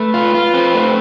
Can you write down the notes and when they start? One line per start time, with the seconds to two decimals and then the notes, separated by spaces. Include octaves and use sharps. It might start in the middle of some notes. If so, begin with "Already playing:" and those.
Already playing: A3 B4
0.14 F4
0.34 F4
0.54 C4
0.75 A3